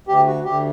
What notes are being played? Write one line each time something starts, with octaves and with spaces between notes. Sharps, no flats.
D2 G4
F#4
D2 G4